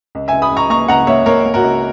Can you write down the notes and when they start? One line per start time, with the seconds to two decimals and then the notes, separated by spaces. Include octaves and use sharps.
0.15 C#2
0.28 C#2 E5 G#5
0.42 B5 D#6
0.51 C#2
0.57 A#5 C#6
0.70 A#3 A#5 C#6
0.88 C#2 F#5 A#5
1.07 A#3 C#5 E5
1.26 A#3 A#4 C#5
1.45 A#3
1.54 F#4 A#4
1.64 C#2